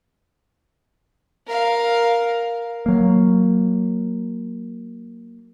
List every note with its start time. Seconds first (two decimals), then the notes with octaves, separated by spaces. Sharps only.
1.47 A#4 F5
2.86 F#3 A#3